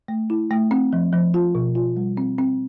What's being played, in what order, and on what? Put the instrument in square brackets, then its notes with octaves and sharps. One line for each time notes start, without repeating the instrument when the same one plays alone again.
[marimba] A3
E4
A3
C4
F3
F3
F4
B2
F4
G3
C4
C4